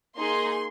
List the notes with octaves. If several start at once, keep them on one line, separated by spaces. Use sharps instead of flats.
A#3 D#4 G#4 C6